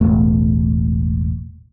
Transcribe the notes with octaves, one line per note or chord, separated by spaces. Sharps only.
E1 A1 A3